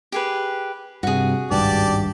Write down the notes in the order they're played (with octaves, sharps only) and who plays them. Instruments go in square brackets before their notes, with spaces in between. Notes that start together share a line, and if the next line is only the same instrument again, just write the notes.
[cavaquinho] G4 G#4 B4
[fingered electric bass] G2 C3 [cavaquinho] F#4 G#4
[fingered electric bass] G#1 C#2 G2 [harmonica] G4 D5 A5